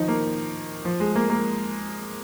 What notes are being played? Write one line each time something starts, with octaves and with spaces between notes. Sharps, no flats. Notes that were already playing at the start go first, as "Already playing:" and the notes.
Already playing: D#3 F3 D#4
A#3
F3
G#3
A#3
A#3